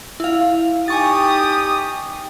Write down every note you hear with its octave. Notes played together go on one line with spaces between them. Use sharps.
E4 F5
D#4 G4 G#5 C#6 D#6 A6